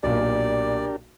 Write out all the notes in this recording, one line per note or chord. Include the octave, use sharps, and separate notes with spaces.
B1 A#2 D4 G4 A#4 D5